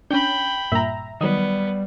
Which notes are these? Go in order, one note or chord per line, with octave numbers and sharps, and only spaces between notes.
C#4 D4 G5 B5 G6
G2 A#2 E5 A#5
D#3 F#3 G3 B3 D#5 D#6